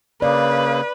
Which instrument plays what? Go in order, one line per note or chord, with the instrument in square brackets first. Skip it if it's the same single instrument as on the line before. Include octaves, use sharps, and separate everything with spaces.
[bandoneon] C#3 A#3 [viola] B4 [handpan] D5